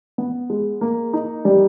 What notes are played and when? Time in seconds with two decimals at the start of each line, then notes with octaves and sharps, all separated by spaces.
0.18 B3
0.50 G#3
0.81 A#3
1.13 D#4
1.45 G3